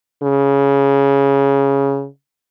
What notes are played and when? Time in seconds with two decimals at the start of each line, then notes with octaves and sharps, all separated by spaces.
0.23 C#3